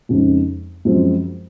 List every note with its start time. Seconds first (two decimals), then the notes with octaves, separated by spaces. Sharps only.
0.09 F2 C#3 G#3 C4 D#4
0.85 F#2 F3 G#3 C4